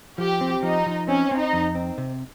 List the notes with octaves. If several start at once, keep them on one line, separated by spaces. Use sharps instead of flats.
F3 G4
C4
F3 D#4
F3
C4 C#4
C4
D#4
F2
C4
C3